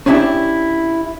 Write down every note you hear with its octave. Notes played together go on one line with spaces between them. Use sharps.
C#4 D4 E4 G4 E5